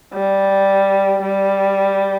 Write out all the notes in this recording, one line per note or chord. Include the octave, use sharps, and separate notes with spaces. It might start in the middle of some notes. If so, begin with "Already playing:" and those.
G3
G3